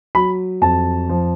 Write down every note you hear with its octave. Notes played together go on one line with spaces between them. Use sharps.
F#3 B5
F2 A5
F3